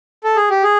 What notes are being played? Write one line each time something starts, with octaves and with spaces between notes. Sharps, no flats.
A4
G#4
G4
G#4